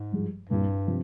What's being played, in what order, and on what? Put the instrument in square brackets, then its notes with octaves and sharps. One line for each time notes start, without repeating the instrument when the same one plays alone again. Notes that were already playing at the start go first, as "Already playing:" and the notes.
Already playing: [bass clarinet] G#2
[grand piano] G2 F3 G#3
[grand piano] C2 A#2 G3 [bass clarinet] G2
[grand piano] C3 F3